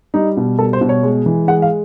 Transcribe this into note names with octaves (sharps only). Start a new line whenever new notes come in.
G3 D#4
B2
G3 A4
C5
B2
C#5
G#3
E3
G#3 F#5
F5